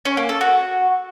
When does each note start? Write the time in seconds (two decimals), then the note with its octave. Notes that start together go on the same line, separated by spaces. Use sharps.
0.05 C#4
0.17 A#3
0.29 A4
0.41 F#4